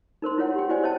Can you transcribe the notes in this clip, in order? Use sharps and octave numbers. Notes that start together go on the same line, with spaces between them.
D#4 A#4 C5 C6
E4 F4 C#5 F#5
G4 G5
E4 F#4 C5 D5 G#5
C5 C#5 D#5 F#5 G5 A5